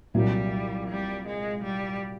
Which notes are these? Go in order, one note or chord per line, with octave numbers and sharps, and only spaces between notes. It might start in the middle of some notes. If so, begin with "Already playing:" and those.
C2 A#2 F#3 G3 A#3
G3
G#3
G3